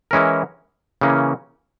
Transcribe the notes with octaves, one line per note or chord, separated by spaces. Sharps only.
E3 G#3 C#4 E4 A#4
C#3 E3 A#3 C#4